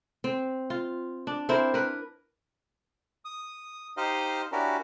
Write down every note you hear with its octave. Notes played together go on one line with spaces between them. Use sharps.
C4
F4
D4
C4 E4 A#4 C5
A#4 B4
D#6
D#4 G4 C5 D#5 F5
C#4 D4 E4 F#4 G4 A#4